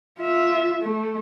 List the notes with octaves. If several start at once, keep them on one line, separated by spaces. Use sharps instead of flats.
F4 E5
A3